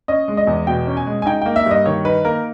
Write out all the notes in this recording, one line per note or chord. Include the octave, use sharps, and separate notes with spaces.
C#4 D#5
G#3
D#5
E2
B2 G5
C#4
G#5
G#3
G#5
D#4 G5
A#3 G5
E5
G2 D#5
D#3 C#5
D#4 B4
A#3 A#4